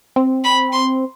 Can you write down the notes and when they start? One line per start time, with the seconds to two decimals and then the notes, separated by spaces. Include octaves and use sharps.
0.16 C4
0.44 B5
0.72 C6